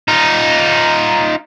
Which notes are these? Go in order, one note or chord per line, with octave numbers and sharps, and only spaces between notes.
D#4 F4